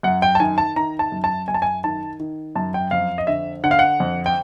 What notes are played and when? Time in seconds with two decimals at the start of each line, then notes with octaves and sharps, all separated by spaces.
0.03 F#2 F#5
0.22 G5
0.35 A5
0.40 D#3 G#5
0.58 A5
0.76 D#3 A#5
0.99 A5
1.12 F#2
1.24 A5
1.48 F#2 G#5
1.54 A5
1.62 G#5
1.84 D#3 A5
2.20 D#3
2.55 F#2 A5
2.74 G5
2.91 F2 F5
3.18 D#5
3.27 D3 E5
3.64 D3 F#5
3.71 F5
3.79 F#5
4.00 F2
4.26 G5